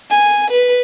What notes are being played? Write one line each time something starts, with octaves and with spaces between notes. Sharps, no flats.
G#5
B4